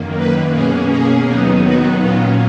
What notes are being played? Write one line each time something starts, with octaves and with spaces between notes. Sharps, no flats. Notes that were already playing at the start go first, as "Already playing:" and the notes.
Already playing: F#2 D#3 A#3
B4
B2 A#3 C#4 G#4
G#4
D#2 D#3 F#3 B3 D#4
F#4
A#2 F#3 C#4 F4